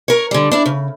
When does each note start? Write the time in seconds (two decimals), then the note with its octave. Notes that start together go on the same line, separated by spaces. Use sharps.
0.08 A#4 C#5
0.31 D3 G3
0.51 D4 E4
0.66 C#3